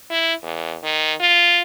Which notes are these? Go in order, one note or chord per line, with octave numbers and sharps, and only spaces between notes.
E4
E2
D#3
F4